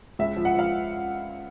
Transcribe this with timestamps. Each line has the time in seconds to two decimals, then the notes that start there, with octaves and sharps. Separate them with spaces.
0.19 C#2 E5
0.36 F3
0.45 F#5
0.55 F3 F5